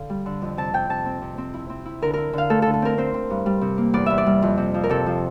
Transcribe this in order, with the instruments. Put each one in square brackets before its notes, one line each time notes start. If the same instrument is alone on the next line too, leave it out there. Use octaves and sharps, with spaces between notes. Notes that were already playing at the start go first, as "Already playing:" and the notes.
Already playing: [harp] D3 A4 F5
G3
D3
F2
C3 A5
C3 G5
C3 A5
C4
C3
C4
E4
C4
E4
D3 A#4
E4 A#4
D3 F5
A3 A4
D3 A4
A4
C4 A#4
C4 C5
C4
G2
G3
C3
A#3
E2 D5
E2 E5
D5
G3
F2
C3
F3
A#4
C3 A4
F3